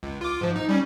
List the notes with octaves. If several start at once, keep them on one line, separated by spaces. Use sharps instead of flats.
C#2
F4 D6
G#2 F3
D#4
G3 C#4